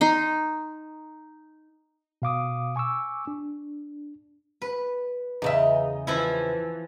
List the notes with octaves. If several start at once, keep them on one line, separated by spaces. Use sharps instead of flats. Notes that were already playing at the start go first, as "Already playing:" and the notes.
D#4 C6
B2 F5 D6 D#6
G#5 C#6 D6 E6
D4
B4
E2 C#3 D#4 E5
E3 F3 E4